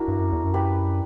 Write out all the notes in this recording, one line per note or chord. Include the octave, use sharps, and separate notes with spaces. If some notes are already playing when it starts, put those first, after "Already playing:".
Already playing: D4 E4 F#4 A#4
G2
F#2
E2
F#2
G4 B4